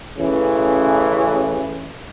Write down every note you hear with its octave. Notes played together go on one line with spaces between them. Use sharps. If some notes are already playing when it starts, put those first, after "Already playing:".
A1 C#3 E3